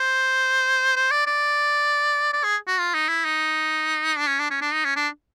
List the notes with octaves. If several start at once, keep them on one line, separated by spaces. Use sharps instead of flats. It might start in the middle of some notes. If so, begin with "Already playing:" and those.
Already playing: C5
C5
D5
D5
D5
G#4
F#4
F4
D#4
E4
D#4
D4
C#4
D4
C#4
D4
D#4
C#4
D4